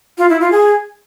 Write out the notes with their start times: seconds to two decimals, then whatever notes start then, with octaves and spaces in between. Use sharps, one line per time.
0.18 F4
0.29 E4
0.41 F4
0.52 G#4